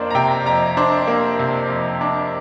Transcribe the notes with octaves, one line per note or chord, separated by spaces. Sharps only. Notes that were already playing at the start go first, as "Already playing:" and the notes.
Already playing: F2 A#3 D4 C5 D5
A#5
C3 G5
F2 A#5
D4 C5
A#3
C3
F2
D4